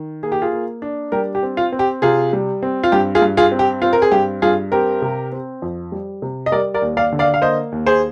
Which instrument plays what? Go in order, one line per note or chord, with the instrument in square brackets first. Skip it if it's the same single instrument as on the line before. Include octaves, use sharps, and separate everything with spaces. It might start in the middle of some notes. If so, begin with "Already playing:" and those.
Already playing: [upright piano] D#3
A#3 G#4
G4
F4 G#4
A#3
D4
G3 G4 A#4
G4
C4
F4
C4
G4
C3 F4 G#4
G3
C4
F4
G2 G4
F4 G#4
G2
F4 G#4
C4
G4
C4 F4
A#4
G#4
G2 G4
G2 F4 G#4
C4 G4 A#4
C3
C4
F2
G3
C3
D#5
G3 A#4 D5
A#4 D5
D#2
D5 F5
D3
D5 F5
F5
A#3 C5 D#5
D#2
G#4 C5